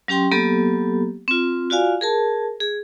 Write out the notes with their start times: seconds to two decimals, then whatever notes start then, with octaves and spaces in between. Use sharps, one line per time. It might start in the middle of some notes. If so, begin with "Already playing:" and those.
0.08 F#3 C#4 G4 G5 C6
0.31 F#3 A#3 B3 G4 A4
1.28 C4 F4
1.70 F4 F#4 D5 F5 G#5
2.01 G#4 A#4 A5
2.60 G#4